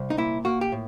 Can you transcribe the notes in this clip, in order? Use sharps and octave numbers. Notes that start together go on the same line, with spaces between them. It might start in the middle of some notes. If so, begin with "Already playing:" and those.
Already playing: C2
D#4
A#2 E4
A#3 F#4
G4
A2